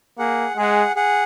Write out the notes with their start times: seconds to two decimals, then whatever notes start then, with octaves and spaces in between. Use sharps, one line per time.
0.19 A#3 G#4 F#5
0.57 G#3 G#4 F#5
0.96 G#4 F#5